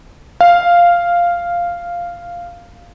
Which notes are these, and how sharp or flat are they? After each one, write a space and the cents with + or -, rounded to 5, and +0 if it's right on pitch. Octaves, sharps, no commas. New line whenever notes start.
F5 -5